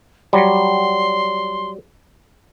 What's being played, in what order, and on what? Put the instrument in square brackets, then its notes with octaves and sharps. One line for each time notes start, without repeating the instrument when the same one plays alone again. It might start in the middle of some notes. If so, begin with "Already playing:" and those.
[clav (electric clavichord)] F#3 G3 [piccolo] C6